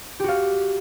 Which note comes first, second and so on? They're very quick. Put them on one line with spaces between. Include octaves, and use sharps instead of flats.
G4 F#4 F5